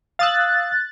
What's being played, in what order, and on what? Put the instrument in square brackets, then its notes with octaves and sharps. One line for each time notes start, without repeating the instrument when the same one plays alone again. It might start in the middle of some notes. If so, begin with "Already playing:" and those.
[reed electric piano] F5 D#6 E6 [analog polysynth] F#6 A6